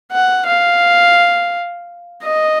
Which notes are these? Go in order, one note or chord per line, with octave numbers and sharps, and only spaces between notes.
F#5
F5
D#5